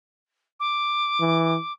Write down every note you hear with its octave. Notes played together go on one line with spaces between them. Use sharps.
D6
E3